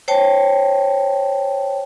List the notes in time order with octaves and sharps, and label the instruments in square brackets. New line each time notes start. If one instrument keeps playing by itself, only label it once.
[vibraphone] C5 C#5 G5 A5